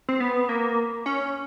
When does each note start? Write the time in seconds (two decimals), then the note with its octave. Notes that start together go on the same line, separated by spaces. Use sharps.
0.09 C4
0.20 B3
0.49 A#3
1.06 C#4